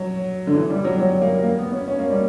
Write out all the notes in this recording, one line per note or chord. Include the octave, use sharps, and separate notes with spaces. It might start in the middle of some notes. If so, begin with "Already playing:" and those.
Already playing: F#3
D3
E3
G3
F#3
F#3
A#3
A#3
B3
C#4
C#4
A#3
G3